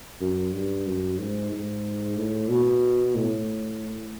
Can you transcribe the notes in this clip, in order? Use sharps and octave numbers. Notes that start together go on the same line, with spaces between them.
F#2
G2
F#2
G#2
G#2
A2
B2
A2